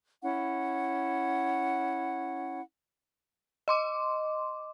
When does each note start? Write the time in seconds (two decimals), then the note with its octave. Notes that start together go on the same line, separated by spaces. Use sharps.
0.22 C#4 E4 F#5
3.68 D#5 C6 D6